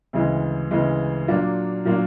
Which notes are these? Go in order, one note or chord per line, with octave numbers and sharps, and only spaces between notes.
D2 C#3 E3 G#3
D2 C#3 E3 G#3
A#2 F#3 A#3 D4 F4
A#2 F#3 A#3 D4 F4